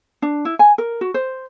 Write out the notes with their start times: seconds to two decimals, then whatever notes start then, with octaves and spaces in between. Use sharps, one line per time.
0.22 D4
0.45 E4
0.59 G#5
0.78 A#4
1.01 F#4
1.14 C5